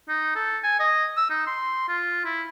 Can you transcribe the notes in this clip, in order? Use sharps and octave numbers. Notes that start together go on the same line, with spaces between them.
D#4
A4
G#5
D#5
E6
D#4
C6
F4
E4